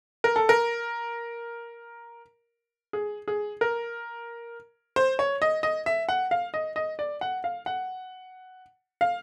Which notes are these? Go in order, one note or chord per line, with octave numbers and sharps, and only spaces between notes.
A#4
A4
A#4
G#4
G#4
A#4
C5
C#5
D#5
D#5
E5
F#5
F5
D#5
D#5
D5
F#5
F5
F#5
F5